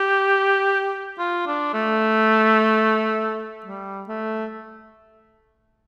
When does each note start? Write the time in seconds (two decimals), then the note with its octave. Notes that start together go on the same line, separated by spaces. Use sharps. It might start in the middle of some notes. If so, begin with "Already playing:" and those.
Already playing: G4
1.19 F4
1.47 D4
1.74 A3
3.66 G3
4.08 A3